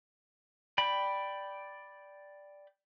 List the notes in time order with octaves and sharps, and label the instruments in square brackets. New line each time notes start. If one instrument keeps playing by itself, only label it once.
[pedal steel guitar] D5 G5 B5